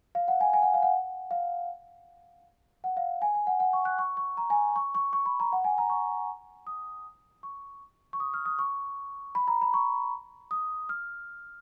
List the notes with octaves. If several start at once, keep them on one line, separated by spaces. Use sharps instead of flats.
F5
F#5
G#5
G#5
F#5
F5
F#5
F5
F#5
F5
G#5
G#5
F#5
F#5
C#6
F#6
C#6
C#6
A#5
G#5
C#6
C#6
C#6
B5
A#5
F#5
G#5
A#5
C#6
D#6
C#6
C#6
D#6
F6
D#6
C#6
B5
A#5
B5
C#6
D#6
F6